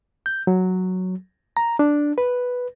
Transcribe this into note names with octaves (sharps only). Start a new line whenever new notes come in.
G6
F#3
A#5
D4
B4